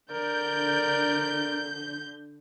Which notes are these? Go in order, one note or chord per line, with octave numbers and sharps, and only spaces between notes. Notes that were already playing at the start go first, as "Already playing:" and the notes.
D3 A#4 D5 G6